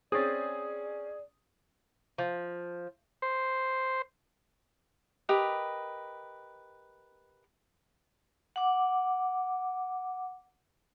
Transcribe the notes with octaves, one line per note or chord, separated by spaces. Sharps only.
C4 C#4 G#4 D5 D#6 G6 A6
F3
C5
G4 A#4 B4 D#5
F#5 D6